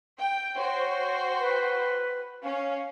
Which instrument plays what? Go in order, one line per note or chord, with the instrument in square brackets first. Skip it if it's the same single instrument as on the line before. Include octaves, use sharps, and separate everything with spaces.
[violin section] G5
[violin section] F#4 C5 G5 [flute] C#5
[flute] B4
[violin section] C#4 [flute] F5